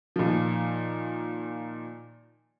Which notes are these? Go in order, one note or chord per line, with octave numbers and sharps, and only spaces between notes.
A#2 D#3 F3